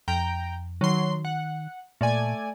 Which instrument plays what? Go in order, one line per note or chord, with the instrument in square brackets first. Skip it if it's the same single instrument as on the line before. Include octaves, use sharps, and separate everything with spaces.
[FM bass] F2 [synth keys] G5 A#5
[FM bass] D#3 [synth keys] F#3 C6
[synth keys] F#5
[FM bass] A#2 [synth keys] A3 D5 G#5